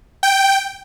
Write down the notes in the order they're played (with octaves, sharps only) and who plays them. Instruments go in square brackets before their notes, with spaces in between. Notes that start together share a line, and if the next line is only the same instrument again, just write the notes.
[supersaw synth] G5